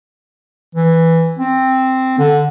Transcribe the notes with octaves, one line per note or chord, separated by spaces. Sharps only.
E3
C4
D3